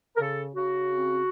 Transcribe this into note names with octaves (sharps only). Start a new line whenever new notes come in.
A#4
C#3 A4
C#3 F#4
C4